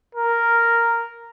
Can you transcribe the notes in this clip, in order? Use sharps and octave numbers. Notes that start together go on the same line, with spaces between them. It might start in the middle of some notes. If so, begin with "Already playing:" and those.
A#4